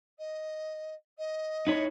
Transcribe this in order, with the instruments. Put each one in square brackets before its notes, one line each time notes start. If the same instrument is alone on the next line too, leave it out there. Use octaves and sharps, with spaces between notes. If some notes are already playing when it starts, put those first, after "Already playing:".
[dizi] D#5
D#5
[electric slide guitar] D#4 E4 C#5